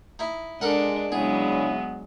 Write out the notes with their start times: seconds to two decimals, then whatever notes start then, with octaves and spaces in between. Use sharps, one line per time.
0.19 D#4 E4
0.61 G#3 D4 A4 A#4 F#5
1.12 C#3 F#3 G#3 B3 D4 E4 G#4